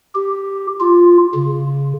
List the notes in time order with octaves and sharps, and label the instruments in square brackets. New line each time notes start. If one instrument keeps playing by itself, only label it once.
[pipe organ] G4
F4
C#3